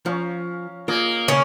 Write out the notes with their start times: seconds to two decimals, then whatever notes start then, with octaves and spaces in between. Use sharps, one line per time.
0.06 F3 C#4 F5 A#5
0.88 A#3 F4 G#4 D#5 F5
1.28 C#3 C#4 C#5 D#5 G#5 C#6